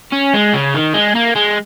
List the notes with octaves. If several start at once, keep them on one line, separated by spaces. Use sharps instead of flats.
C#4
G#3
C#3
D#3
G#3
A#3
G#3